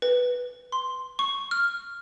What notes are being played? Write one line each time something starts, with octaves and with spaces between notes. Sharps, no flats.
B4
C6
C#6
F6